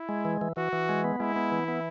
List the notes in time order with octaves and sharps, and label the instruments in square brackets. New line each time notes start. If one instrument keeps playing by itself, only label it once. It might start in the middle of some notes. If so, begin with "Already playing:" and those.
Already playing: [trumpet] E4
[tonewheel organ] G#3
E3
E3
[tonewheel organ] E3 [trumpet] F#4
[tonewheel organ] E3
G#3
B3
[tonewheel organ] G#3 [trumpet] E4
[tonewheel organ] B3
E3
B3